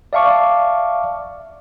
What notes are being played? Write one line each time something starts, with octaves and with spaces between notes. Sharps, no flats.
D5 E5 F5 A5 C#6 D6